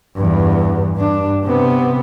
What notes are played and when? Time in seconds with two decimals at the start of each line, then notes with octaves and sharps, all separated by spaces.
0.16 E2 G2
0.96 G2 D4
1.44 C3 B3